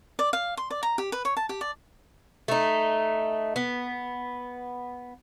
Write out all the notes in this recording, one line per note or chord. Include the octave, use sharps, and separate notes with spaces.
D5
F5
C6
D5
A#5
G4
B4
C#5
A5
G4
D5
A3 D#4
B3